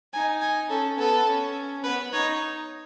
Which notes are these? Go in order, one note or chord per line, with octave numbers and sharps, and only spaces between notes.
D#4 G#5
G#5
C#4 A4
B3 A4
C#4
B3 B4
D#4 C#5